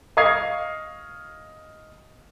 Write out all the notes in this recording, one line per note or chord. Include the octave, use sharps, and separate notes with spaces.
D#5 F5 C#6 D#6 G#6 C7